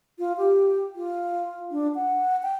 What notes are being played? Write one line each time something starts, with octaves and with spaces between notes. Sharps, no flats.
F4
G4
F4
D4
F#5
G5